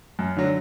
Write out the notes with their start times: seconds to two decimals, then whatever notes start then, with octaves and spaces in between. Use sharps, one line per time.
0.19 F#2
0.37 D3 F#3